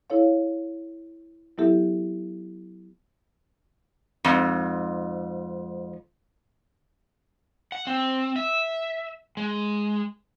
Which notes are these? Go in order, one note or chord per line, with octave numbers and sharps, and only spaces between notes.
E4 A4 C#5 F5
F#3 B3 E4 G4 A4 E5
F2 G#2
F#5
C4
E5
G#3